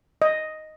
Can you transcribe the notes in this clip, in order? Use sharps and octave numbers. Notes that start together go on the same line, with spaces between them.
D#5